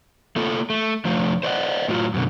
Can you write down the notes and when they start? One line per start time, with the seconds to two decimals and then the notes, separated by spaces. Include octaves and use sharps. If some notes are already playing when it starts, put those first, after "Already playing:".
0.36 A3 A#3 F4 A4
0.70 A3
1.05 D3 F3 A3 C5
1.43 C5 D5 D#5 F5 F#5
1.88 A2 F#3 F4
2.14 F#2 B2 D3